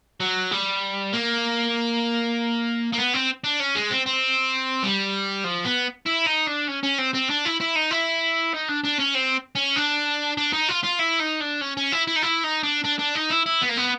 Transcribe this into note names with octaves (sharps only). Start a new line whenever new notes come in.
F#3
G3
A#3
A#3
B3
C4
D4
C#4
G#3
C4
C4
G3
F3
B3
E4
D#4
D4
C#4
C#4
C4
C4
D4
E4
E4
D#4
E4
D#4
D4
D4
C#4
C4
C#4
D4
D4
D#4
F4
F4
E4
D#4
D4
C#4
C#4
E4
E4
D#4
E4
D#4
D4
D4
D4
D#4
E4
E4
B3
A#3
B3